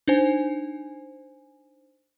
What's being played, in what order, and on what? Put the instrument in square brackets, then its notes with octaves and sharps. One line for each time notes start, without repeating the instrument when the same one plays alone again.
[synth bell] D4 D#4 C5 G#5